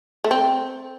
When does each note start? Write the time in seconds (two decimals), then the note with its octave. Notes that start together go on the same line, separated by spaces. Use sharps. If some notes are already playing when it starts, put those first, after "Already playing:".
0.24 A3
0.31 C4